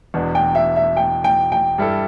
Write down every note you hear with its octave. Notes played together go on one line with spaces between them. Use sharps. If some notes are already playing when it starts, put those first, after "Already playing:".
E1 E2 B2 B3 D4
G5
E5
E5
G5
G5
G5
G2 G3 E4 A4